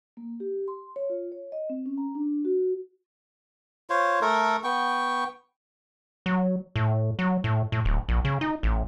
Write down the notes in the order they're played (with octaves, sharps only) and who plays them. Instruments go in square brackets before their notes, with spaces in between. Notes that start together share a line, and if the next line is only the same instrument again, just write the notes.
[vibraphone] A#3
G4
C6
C#5
F4
C#5
D#5
C4
C#4
A#5
D4
F#4
[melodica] F4 C5 C#5
A3 A4 A#4
B3 G5 C#6
[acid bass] F#3
A2
F#3
A2
A2
D1
A#1
C#3
D#4
A1